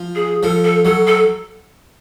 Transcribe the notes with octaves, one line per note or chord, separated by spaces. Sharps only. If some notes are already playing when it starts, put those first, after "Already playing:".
Already playing: F3
G#4
F3 A4
A4
F#3 A4
A4